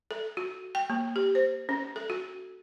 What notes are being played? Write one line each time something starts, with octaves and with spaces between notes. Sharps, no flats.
A4
F#4
G5
A#3
G4
C5
C#4
A4
F#4